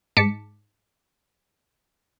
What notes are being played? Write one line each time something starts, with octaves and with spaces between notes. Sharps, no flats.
G#2 G#3 A5 D6 B6 C#7